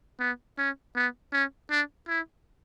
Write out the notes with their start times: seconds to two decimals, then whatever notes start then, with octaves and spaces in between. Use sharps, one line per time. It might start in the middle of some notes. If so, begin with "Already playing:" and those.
0.20 B3
0.58 C#4
0.96 B3
1.33 C#4
1.70 D4
2.08 E4